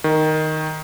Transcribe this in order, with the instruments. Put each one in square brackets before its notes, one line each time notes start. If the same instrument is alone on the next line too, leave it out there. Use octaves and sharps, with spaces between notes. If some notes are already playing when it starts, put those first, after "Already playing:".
[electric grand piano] D#3